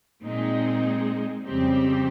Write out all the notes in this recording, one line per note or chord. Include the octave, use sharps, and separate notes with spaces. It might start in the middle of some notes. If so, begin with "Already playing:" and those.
A#2 G#3 C4 D#4 G#4
F2 C#3 G3 C4 G4